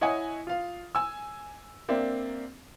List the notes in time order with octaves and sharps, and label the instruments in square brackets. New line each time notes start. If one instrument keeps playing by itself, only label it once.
[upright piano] E4 C#5 D#5 F#5 G#5 D#6
F4 F5
G#5 E6
A#3 C4 D4 E5